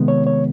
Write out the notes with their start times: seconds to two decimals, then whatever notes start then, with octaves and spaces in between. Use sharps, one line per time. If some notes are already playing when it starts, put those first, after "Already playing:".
Already playing: C3 D#3 G#3 B3
0.08 C#5
0.27 C#5